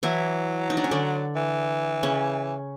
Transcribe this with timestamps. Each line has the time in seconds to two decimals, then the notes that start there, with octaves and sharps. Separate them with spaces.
0.03 E3 F#3 E4
0.70 D#4
0.77 D4
0.84 C#4
0.91 D3 D4
1.36 E3
2.03 C#3 C#4